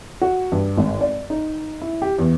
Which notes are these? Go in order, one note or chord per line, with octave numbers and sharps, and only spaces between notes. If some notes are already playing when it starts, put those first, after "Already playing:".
F#4
G2
G#1
D5
D#4
E4
G4
E2